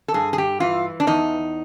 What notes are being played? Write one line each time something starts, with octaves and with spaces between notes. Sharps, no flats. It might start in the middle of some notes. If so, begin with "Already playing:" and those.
A4
G2 G#4
G#4
G4
E3 F4
D4
E2 D#4